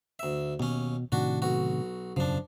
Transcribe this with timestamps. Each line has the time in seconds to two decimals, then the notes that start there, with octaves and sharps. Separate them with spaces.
0.19 D2 E5
0.60 D#2 B2 C#4
1.12 A2 C3 D#3 D4 F#4
1.42 B1 F#4
2.16 E1 F#2 C#3 F3 D4